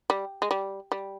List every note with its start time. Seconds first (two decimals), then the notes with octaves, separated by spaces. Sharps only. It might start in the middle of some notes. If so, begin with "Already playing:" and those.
0.10 G3
0.42 G#3
0.51 G3
0.92 G3